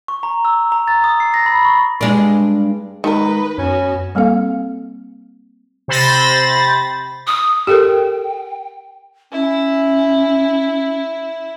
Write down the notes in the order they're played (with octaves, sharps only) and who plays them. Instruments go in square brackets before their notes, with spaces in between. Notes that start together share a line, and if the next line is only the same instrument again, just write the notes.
[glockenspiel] C#6
A#5
E6
A#5
A6
D#6
C7
A#6
B5
C#6
[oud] G2 G#3 D4
[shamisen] D#3 A#4 [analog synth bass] G#3 [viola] D#4 B4
[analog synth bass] F#2 [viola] B3 F#4 [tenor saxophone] C#4
[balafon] G3 A#3 C4 A4 F5
[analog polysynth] C3 C5 B5 A6 A#6
[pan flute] D#6
[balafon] G4 A4 A#4 [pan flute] G5
[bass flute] C#4 [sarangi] E4